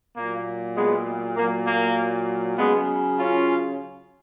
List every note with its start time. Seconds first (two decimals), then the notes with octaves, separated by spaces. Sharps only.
0.16 A#2 F#3 A#3
0.76 G#3 B3
1.37 A#2 F#3 A#3
1.67 A#3
2.58 C#3 F#3 G#3 B3
3.18 C#4 F4